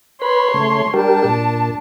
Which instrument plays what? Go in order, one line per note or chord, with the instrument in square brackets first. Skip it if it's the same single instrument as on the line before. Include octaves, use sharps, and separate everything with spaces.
[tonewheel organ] B4 B5 [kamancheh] C#5 C6
[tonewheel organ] C#3 A3
[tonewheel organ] G3 G4 A#4 [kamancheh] D4 A5
[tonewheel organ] A#2